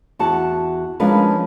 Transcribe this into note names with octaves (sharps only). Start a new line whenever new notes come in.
E2 F#4 A5
F3 G#3 C#4 D4 A#4 B4